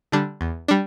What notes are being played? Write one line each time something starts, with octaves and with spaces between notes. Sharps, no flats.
D3 G3 D4
E2
G3 D4